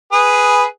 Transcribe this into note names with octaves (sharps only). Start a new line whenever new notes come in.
G#4 B4